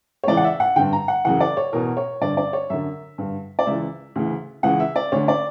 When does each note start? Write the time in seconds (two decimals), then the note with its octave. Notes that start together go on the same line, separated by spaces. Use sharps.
0.24 C#5
0.27 C#2 C#3 E3 D5
0.37 F#5
0.44 E5
0.60 F#5
0.76 G2 D3 G5
0.93 A#5
1.08 F#5
1.25 F#2 C#3 E3 F#5
1.40 D5
1.57 C#5
1.73 E2 B2 A#4
1.97 C#5
2.21 G2 D3 D5
2.37 D5
2.53 C#5
2.70 F#2 D3 E5
3.18 G2 D3
3.59 D5
3.66 C#2 C#3 E3 E5
4.16 D2 C#3 E3
4.63 C#2 C#3 E3 F#5
4.80 E5
4.96 D5
5.12 D2 D3 C#5
5.28 D5